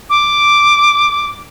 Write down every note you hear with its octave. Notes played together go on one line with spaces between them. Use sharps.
D6